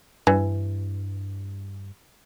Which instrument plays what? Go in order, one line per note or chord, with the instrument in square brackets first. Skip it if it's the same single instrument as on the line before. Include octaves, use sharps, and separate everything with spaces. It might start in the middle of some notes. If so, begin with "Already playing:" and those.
[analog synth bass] G2 [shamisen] E3